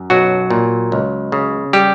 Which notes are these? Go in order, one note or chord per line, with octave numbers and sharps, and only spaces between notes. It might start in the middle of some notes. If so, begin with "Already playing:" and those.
Already playing: F#2
B1 F#3 F#4
A#2
C#2
C#3
G3 G4